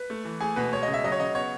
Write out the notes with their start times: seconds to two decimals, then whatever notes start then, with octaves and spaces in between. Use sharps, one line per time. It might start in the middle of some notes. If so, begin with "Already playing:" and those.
Already playing: B4
0.10 A3
0.25 E3
0.40 A3 G#4
0.56 B2 B4
0.72 G#3 C#5
0.83 D#5
0.88 C#3
0.94 E5
1.04 F#3 D#5
1.12 C#5
1.20 C#3 D#5
1.35 B3 C#5